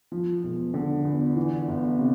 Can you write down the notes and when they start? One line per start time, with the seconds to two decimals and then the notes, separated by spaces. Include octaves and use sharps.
0.12 F3
0.43 E1
0.74 D3
1.05 E2
1.36 E3
1.68 G1
1.99 C3